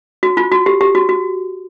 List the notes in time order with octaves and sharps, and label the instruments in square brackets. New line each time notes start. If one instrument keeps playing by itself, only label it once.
[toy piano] F#4
F4
F#4
G4
G4
F#4
F#4